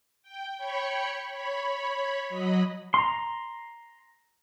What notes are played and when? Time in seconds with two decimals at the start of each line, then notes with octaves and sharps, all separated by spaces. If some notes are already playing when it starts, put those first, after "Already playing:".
0.23 G5
0.58 C#5 G5 B5 C#6
1.29 C#5 B5
2.29 F#3 D#5 B5
2.94 A#5 C6